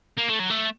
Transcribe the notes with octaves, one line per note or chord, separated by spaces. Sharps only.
A#3
A3
F#3
A3